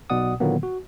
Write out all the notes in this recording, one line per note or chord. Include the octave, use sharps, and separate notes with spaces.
B1 B2 D5 F#5 D#6
A#2 D3 D#3 F#3 A#3 B3
F#4